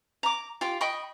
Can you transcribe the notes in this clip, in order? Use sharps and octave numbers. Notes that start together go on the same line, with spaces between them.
A#5 D6
F4 G4
D#5 G5 B5 C#6